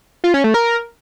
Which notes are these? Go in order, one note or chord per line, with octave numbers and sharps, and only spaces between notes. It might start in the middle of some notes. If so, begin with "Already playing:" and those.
F4
C#4
A3
A#4